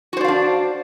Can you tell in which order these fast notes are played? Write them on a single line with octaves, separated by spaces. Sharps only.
F#4 C5 D5 F5 D4